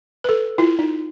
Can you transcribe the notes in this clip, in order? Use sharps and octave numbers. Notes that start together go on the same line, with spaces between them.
A4 B4
E4 F4
D#4